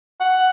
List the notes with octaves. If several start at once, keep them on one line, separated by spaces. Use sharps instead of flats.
F#5